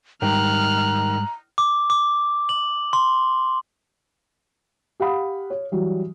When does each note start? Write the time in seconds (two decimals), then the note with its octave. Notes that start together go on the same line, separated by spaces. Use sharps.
0.22 G#2 D#3 G3 A#5 F6 F#6
1.58 D6
1.90 D6
2.49 F#7
2.93 C6
5.00 G4 F5 F#5 B5 D#6
5.50 C#5
5.72 E3 F#3 G3